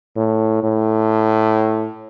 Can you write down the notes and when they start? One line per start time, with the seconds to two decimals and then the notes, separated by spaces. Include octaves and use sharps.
0.17 A2
0.63 A2